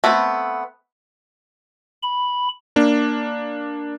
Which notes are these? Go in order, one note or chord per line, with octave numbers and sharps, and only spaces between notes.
A3 B3 C4 B4
B5
A#3 D4